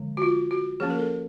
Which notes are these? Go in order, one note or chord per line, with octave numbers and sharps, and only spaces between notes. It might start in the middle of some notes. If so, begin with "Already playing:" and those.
Already playing: D3 F3 G#3
F#4
F4
F#4
F3 A#3 C#4 G#4
A#4
A4